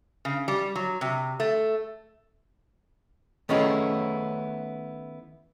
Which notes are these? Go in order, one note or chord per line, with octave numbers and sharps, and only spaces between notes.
C#3
G3
F#3
C3
A3
D#3 A3 B3 C#4 E4 G#4